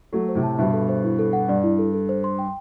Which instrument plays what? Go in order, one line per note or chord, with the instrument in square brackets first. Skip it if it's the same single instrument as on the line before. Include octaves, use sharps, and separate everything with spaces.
[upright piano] F#3 A3 [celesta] A4
[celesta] C5
[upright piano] A2 C3
[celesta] A5
[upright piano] G2 B2 [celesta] E5
[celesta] A4
C5
E4
A4
F#5
[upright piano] G2 [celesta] D5
[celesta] E4
A4
A4
C5
C6
G5